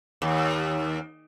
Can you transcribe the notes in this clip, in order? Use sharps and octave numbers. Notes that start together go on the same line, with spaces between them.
D#2